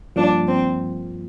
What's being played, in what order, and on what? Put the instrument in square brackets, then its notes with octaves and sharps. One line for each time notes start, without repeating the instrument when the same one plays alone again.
[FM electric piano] G2 F3 A#3 [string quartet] D4
[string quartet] C4